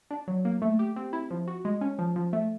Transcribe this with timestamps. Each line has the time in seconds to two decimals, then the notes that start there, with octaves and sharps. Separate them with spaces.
0.11 D4
0.28 F#3
0.45 A#3
0.62 A3
0.79 G4
0.96 C4
1.13 E4
1.31 F3
1.48 F#4
1.65 G#3
1.81 C#4
1.99 F3
2.16 F3
2.33 A3